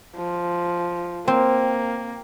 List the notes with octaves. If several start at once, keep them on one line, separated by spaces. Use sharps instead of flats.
F3
A#3 C4